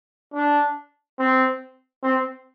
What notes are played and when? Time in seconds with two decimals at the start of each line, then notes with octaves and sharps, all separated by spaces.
0.34 D4
1.19 C4
2.03 C4